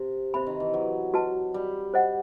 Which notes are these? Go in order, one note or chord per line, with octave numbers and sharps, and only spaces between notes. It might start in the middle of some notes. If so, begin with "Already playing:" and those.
Already playing: C3
C3 C5 E5 B5
D#3
E3
F#3
F#4 B4 D#5 A5
G3
C5 D#5 F#5